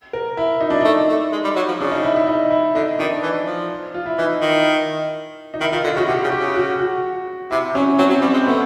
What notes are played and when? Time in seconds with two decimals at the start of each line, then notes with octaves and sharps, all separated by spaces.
0.13 A#4
0.37 E4
0.61 D#4
0.70 D4
0.81 A3 D#4
1.09 A3
1.32 G#3
1.44 G3
1.56 F#3
1.68 F3
1.80 C#3 D4
1.91 D#4
2.03 E4
2.16 E4
2.27 D#4
2.51 E4
2.75 D3 D#4
2.99 D#3 D4
3.23 E3
3.47 F3
3.94 F4
4.06 E4
4.18 E3 D#4
4.41 D#3
5.54 D#4
5.61 D#3 E4
5.72 D#3 F4
5.84 D3 F4
5.97 C#3 F#4
6.08 C3 G4
6.24 C#3
6.32 G4
6.40 C#3
6.56 F#4
6.79 F#4
7.51 C3 E4
7.75 F#3 C#4
7.98 F#3 C4
8.10 F#3
8.22 G3 C4
8.33 G#3
8.46 A3 B3